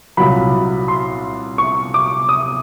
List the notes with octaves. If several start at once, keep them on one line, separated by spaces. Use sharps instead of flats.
C2 A#2 F#3 B5
C6
C#6
D6
D#6